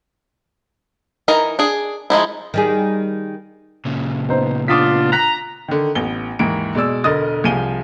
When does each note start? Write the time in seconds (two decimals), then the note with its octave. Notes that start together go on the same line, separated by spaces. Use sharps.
1.28 E3 D#4 A#4
1.59 D4 G#4
2.10 F3 G#3 D#4 E4
2.54 D#3 G3 G#4
3.85 A#2 C#3
4.29 B3 D#4 C5
4.68 B3 D4 F4 D6 D#6 B6
5.12 A#5 F#6 B6
5.68 D3 D#3
5.95 A1 B3 G7
6.39 D#2 G#2 E3 D7
6.75 B2 G#3 D5 E6
7.04 E1 D3 A#4 D#5 D#6 A6
7.44 C2 F3 G#4 D#7 G7